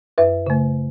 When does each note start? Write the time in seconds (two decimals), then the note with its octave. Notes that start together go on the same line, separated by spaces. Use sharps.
0.18 F#2 B4 E5
0.47 C#3 A3